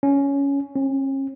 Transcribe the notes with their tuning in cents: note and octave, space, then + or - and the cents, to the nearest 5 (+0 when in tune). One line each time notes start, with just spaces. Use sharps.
C#4 +10
C#4 -40